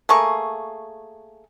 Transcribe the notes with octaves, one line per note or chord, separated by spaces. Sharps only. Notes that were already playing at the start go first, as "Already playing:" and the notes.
A3 A#3 G#4 C#6